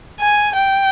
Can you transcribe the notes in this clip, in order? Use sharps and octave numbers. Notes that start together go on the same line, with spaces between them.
G#5
G5